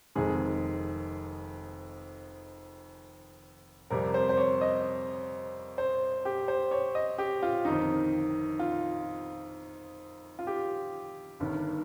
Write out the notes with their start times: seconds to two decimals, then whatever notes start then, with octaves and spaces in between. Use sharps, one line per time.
0.15 F1 F2 D#3 G#3 G#4
3.90 F2 C3 G3 A#4
4.14 C5
4.29 C5
4.37 C#5
4.61 D#5
5.78 C5
6.25 G4
6.48 C5
6.71 C#5
6.95 D#5
7.18 G4
7.43 F4
7.65 G1 F2 D#3 D#4
8.59 F4
10.39 F4
10.47 G4
11.40 G1 G2 D#3